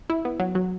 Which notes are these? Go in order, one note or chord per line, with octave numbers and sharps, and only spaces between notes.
E4
B3
F#3
F#3